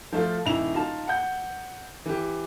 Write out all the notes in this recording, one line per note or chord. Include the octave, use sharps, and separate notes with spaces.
F3 A3 F4
D#1 D#4 E4 F7
D#4 F4 A5
F#5 G6
E3 G4